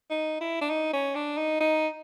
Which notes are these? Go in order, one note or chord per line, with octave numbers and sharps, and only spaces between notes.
D#4
E4
D4
D#4
C#4
D4
D#4
D#4